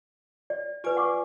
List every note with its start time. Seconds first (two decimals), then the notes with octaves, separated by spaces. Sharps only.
0.50 D5
0.84 F4 G4 B4 D5 G#5
0.97 F#5 C#6 D6